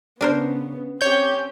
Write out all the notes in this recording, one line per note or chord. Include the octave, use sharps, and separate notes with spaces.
C#3 B3 D4 A#4 C5
C4 C#4 G4 C#5 G6